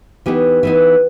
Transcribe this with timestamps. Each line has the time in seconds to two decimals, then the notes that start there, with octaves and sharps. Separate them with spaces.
0.26 E3 B3 D#4 G4
0.63 E3 B3 D#4